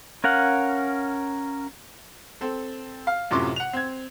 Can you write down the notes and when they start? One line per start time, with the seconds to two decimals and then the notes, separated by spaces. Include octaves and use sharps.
0.24 C#4 A#4 F5 F#5
2.41 C4 A4
3.07 F5
3.31 F#2 A2 C3 F4 C6 D6
3.56 F#5 F7
3.73 C4 G#6